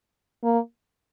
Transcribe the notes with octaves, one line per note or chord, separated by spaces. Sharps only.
A#3